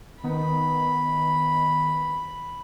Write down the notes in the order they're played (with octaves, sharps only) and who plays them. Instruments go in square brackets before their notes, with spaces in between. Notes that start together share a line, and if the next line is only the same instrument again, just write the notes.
[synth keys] D#3 B3 D#4 [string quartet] B5